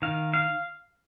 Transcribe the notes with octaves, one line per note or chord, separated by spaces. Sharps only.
D#3 F5
F5